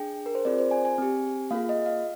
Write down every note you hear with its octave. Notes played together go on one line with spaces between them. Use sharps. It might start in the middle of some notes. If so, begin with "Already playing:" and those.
Already playing: D4 G#4 G5
A#4
C5
C4 F4 G#4 D5
C5
G#5
G#5
C4 G4
A#3 F4 G#4 F5
D#5
F5